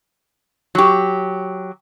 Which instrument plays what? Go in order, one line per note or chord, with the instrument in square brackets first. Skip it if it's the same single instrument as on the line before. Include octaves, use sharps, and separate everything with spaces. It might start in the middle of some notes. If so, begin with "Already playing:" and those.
[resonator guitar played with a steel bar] F#3 G4